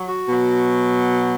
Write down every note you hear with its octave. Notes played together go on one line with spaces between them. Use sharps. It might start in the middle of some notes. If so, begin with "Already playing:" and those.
Already playing: F#3
F#4
B2 F#3